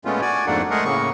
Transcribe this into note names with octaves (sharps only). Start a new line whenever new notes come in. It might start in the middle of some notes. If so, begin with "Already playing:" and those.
A#2 G#3 A3 B3 C#4 F4
F#4 D5 G#5
F2 G#2 A3 A#3 D4 F#5
G#3 A3 G#4 A#4 F#5
A2 C#3 A#3 C#6